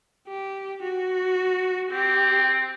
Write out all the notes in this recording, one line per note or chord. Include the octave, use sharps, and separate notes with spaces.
G4
F#4
C4 G4